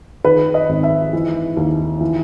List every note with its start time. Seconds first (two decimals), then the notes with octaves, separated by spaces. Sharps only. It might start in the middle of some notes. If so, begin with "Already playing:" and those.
0.24 D#3 B4
0.54 D#5
0.69 G#1
0.83 E5
1.13 E3
1.57 D#2
2.01 E3